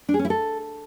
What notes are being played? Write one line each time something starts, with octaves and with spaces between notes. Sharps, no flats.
D4
G#4
C#4
E4
A4